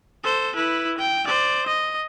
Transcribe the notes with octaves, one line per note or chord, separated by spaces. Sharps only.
A4 C5
E4 B4
G5
C5 D5
D#5